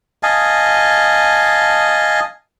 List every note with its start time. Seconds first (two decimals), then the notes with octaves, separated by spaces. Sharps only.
0.23 D#5 F5 G#5 A5